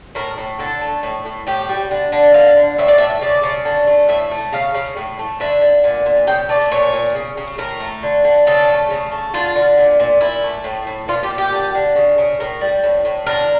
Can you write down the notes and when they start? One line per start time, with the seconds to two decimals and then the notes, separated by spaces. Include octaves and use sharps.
0.15 A2 A#4
0.38 A2
0.59 D3 A4
0.81 A3
1.03 A2
1.26 A2
1.47 A2 G4
1.69 G3
1.91 D3
2.12 D3
2.34 D3 F5
2.56 D3
2.78 A2 E5
2.88 D5
2.98 A3 E5
3.21 C#3 D5
3.43 C#3
3.65 D3
3.87 A3
4.09 A2 E5
4.31 A3
4.53 C#3 F5
4.75 C#3
4.97 A2
5.19 A3
5.40 D3 E5
5.62 D3
5.84 A#2
6.06 A#2
6.27 C#3 G5
6.49 A3 D5
6.71 A#2 C#5
6.93 A#2
7.15 C#3
7.37 C#3
7.58 A2 A#4
7.80 A3
8.03 D3
8.24 D3
8.47 C#3 A4
8.69 A3
8.91 C#3
9.12 A3
9.34 D3 F4
9.56 D3
9.78 A#2
10.00 A#2
10.21 A#2 E4
10.43 A3
10.64 A2
10.87 A2
11.08 A#2 F4
11.23 G4
11.30 A#2
11.38 G4
11.53 D3
11.75 D3
11.96 C#3
12.18 C#3
12.40 A2 A#4
12.61 G3
12.83 A2
13.05 A2
13.26 D3 A#4